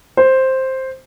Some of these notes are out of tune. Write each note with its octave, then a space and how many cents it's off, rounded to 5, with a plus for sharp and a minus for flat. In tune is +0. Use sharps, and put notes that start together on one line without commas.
C5 +5